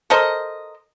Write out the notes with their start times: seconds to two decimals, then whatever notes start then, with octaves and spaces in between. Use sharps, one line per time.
0.10 A4 A#4 C5 D#5